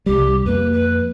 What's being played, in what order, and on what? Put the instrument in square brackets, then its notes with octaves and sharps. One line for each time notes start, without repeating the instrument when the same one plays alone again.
[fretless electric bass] C2 G3 [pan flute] G4
[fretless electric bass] F2 A#3 [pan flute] B4
[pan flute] B4